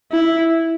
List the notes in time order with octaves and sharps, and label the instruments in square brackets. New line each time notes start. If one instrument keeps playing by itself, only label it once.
[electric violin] E4